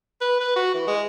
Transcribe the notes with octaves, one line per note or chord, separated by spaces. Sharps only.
B4
B4
F#4
E3
G#3